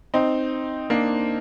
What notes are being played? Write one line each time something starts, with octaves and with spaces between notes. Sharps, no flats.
C4 D#4
A#3 D4